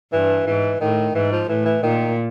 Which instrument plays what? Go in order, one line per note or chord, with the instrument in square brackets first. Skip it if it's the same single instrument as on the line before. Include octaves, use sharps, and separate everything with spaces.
[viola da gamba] G2 [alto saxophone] E3
[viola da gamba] G#2 [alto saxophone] E3
[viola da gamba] A2 [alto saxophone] D#3
[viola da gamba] G#2 [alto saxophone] E3
[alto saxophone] F3
[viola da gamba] A2 [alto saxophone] E3
[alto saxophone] E3
[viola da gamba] A#2 [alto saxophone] D#3